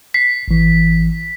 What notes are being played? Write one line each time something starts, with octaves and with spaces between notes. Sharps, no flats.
B6 C7
G#1 E3